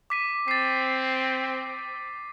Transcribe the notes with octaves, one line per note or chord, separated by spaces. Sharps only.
D6 B6 D#7
C4 A6 C7